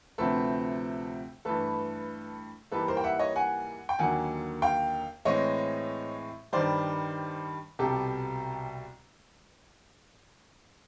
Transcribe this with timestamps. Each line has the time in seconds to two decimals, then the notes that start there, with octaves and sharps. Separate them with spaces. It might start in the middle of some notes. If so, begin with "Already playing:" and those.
0.18 D2 C3 F3 A3 C4 A4 B4
1.45 G2 E3 A3 A4 B4
2.72 G#2 E3 G3 A#3 A4 B4
2.88 A#4 C5
2.97 G5
3.04 E5 F#5
3.19 C#5 D#5
3.36 F#5 G#5
3.89 G5
3.99 D#2 D3 F#3 A#3 F#5 G#5
4.62 F5 G5
5.25 A2 E3 G#3 C4 C#5 D#5
6.53 G2 D#3 G3 C5 D5
7.79 C2 B2 G3 G4 A4